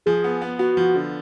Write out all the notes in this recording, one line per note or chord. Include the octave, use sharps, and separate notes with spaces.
F3 G#4
B3
B3
B3 F#4
F3
D3